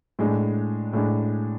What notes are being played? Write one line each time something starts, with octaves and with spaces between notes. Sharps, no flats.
A2 G#3 D4
A2 G#3 D4